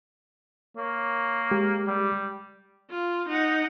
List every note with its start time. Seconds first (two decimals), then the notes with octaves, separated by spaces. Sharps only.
0.77 A#3 C#5
1.51 G#3 G4
1.87 G3
2.91 F4
3.29 D#4 F#5